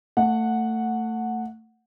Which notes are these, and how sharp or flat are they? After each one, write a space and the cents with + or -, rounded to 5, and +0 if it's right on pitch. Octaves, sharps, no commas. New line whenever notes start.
A3 +25 F#5 -10